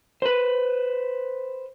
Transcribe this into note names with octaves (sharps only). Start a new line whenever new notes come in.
B4 C5